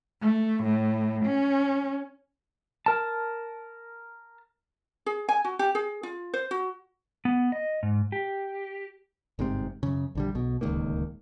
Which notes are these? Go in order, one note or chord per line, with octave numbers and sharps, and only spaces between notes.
A3
A2
C#4
A#4 A5
G#4
G#5
F#4
G4
G#4
F4
C5
F#4
B3
D#5
G#2
G4
G1 G#2 C3 C4
F#2 C#3
A#1 D3 G3
B1 B2
D1 C#2 D#3 A#3